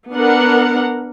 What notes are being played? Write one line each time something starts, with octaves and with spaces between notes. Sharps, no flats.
B3 D4 A#4 F#5